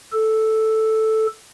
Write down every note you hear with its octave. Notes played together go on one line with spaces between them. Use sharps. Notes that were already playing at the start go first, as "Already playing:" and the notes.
A4